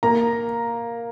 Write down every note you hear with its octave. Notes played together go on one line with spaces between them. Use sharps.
A#3 A#5